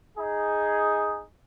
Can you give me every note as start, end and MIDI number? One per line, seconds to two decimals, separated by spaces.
0.17 1.23 63
0.17 1.23 68